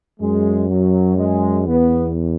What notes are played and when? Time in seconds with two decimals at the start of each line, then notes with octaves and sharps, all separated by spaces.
0.20 F#2 G#3
0.69 F#3
1.17 G#3
1.66 E2 B3